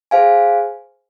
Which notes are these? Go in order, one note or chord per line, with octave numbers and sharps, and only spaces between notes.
G#4 C5 F5 G#5